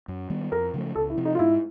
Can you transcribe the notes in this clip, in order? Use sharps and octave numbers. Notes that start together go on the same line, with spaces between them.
F#2
D#3 G3 B3
F2 A#4
C#3 F3 A3
C#2 A4
E4
C3 F3
D#4
F4
G#2 E4